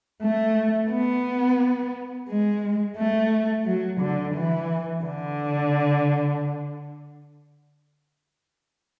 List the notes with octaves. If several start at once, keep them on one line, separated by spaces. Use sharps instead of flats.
A3
B3
G#3
A3
F#3
D3
E3
D3